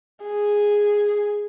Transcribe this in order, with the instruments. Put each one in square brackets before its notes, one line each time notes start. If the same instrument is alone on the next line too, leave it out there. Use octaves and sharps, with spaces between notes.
[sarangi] G#4